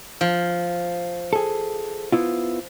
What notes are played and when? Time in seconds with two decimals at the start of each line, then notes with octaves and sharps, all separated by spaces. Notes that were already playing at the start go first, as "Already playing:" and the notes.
0.21 F3
1.33 G#4 A4
2.12 B3 E4 F4